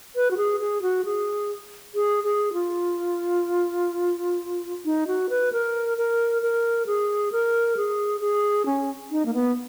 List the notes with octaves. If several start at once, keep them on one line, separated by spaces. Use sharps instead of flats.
B4
F#4
G#4
G#4
F#4
G#4
G#4
G#4
F4
D#4
F#4
B4
A#4
A#4
A#4
G#4
A#4
G#4
G#4
C#4
D#4
A#3
B3